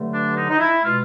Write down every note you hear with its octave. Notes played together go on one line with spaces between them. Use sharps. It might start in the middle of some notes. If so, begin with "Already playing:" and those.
Already playing: G2 D3 F#3 A3
D4
D#4
D#4
E4
B2 G#3 F4